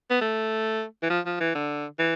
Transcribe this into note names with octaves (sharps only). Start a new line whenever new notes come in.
B3
A3
E3
F3
F3
E3
D3
E3